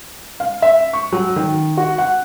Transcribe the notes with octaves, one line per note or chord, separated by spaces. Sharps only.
F5
E5
C#6
F#3
D#3
F#4
F#5